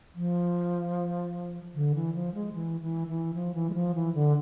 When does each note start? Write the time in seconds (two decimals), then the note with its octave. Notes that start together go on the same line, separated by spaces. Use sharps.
0.15 F3
1.75 D3
1.95 E3
2.15 F3
2.35 G#3
2.54 E3
2.81 E3
3.08 E3
3.34 F3
3.54 E3
3.70 G#3
3.74 F3
3.95 E3
4.14 D3